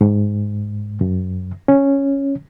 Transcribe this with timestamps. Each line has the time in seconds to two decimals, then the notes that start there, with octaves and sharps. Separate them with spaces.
0.01 G#2
1.01 F#2
1.68 C#4